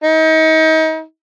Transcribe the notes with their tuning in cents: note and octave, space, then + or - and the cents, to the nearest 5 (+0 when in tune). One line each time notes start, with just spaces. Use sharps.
D#4 +35